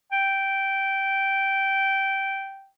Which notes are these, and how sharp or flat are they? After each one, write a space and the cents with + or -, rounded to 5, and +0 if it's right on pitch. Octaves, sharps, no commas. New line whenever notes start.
G5 -10